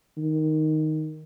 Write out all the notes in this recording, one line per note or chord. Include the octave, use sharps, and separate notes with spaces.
D#3